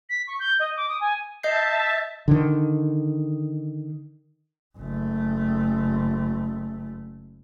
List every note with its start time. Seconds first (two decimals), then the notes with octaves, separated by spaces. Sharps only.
0.09 B6
0.27 C#6
0.40 G6
0.60 D#5
0.77 D6
0.89 D#6
1.01 G#5
1.43 D#5 E5 A5 G6 C7
2.28 D3 D#3
4.78 F#1 A3